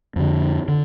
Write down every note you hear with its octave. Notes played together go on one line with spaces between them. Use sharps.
F2 D3
D3